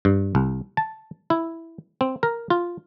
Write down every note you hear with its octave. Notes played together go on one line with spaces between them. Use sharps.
G2
C2
A5
E4
C4
A#4
F4